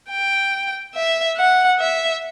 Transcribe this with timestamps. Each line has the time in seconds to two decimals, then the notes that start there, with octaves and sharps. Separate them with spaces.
0.11 G5
0.95 E5
1.37 F#5
1.79 E5